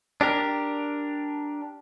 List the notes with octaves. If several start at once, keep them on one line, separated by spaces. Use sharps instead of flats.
D4 G4 A#4